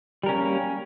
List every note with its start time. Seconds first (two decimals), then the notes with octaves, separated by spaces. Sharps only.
0.23 G3
0.26 A#4
0.29 C#4
0.32 A#3